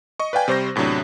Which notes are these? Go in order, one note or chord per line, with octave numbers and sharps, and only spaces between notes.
D#5 C#6
B4 D5 F5 G5 G#5
C3 G3 C5 C#6 G6 A#6
E2 A2 C3 F#3 D4